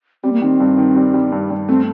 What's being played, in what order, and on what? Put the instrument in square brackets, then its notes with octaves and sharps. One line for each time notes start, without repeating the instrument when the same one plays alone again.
[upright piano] G3 [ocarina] C4
[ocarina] A#3
[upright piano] D#3 [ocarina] C4
[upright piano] G2
D#3
G3
G3
G2
G2
[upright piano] A3 [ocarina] C4